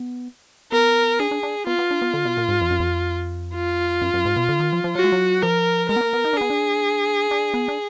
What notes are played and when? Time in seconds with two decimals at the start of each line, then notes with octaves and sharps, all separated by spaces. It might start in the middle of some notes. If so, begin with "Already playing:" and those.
Already playing: B3
0.72 B3 A#4
1.19 D4 G#4
1.31 D4
1.43 D4
1.67 B3 F4
1.79 B3
1.91 D4
2.02 B3
2.13 D3
2.25 B2
2.37 A#2
2.49 G#2
2.61 F2
2.71 F#2
2.80 F2
3.55 F4
4.01 F#2
4.14 F#2
4.25 G#2
4.36 B2
4.49 D3
4.60 D#3
4.73 F3
4.84 F3
4.95 F#3 F#4
5.04 G#3
5.12 F#3
5.42 F3 A#4
5.89 G#3 A#4
5.96 B3
6.01 A#3
6.13 B3
6.24 D#4
6.33 D4
6.37 B3 G#4
6.50 D4
7.31 D4
7.54 B3
7.68 D4